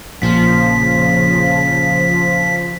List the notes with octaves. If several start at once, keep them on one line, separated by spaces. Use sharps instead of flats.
A#1 A#2 C#3 F3 B6